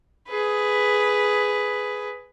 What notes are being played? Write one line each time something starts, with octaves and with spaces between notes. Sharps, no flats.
G#4 B4